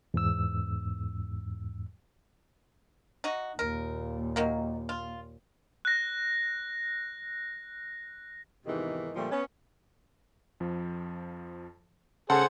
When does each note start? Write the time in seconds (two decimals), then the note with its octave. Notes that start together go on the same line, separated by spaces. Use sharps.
0.14 E2 G#2 E6
3.24 D#4 F#4
3.59 D#2 A#2 A#4
4.36 D#3 F#3 A#3
4.89 F4
5.85 F#6 A#6
8.66 E2 G#2 C3 D#3 E3
9.16 A#2 D3 F3 G3 A3
9.32 B3 C#4
10.60 F2 F3
12.30 C#3 G#4 A4 C5 F#5